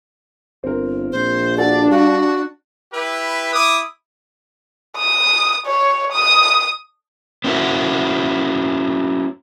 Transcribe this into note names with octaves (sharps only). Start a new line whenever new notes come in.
G1 C4 A#4
A#1 C5
D4 F#4 A4 D5 F#5
G3 F#4 F5
E4 G4 B4
E4 D6 D#6
D#6
C#5
D#6
B3 C#4 E4 F#4 A#4 C5